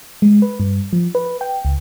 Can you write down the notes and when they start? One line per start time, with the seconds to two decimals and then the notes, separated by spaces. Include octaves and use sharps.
0.22 G#3
0.42 B4
0.60 G2
0.93 F3
1.15 B4
1.41 G5
1.65 C#2